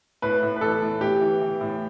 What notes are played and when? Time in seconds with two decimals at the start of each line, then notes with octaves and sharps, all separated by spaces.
0.22 A2 B4
0.43 A2
0.56 B4
0.61 E3 A4
0.82 A2
1.01 A2 G4
1.21 E3
1.41 E3
1.61 A2